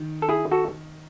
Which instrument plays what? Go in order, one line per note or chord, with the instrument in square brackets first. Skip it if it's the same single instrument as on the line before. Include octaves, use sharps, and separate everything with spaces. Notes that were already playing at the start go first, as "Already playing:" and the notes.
Already playing: [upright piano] D#3
[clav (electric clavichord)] A4
E4 G#4
F#4 A4